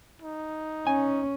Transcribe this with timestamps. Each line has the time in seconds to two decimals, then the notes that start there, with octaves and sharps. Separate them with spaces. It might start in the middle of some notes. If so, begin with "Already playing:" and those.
0.22 D#4
0.87 C#4 G#5